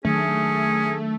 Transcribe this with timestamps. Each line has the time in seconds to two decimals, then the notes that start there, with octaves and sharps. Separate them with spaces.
0.05 D#3 F#3 A3 C#4 D4 G#4